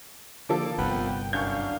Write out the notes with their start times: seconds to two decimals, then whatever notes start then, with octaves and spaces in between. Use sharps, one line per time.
0.49 D3 F3 A#3 A4 D6
0.78 G1 C2 B3 G5
1.33 F#2 D4 F5 C#6 G6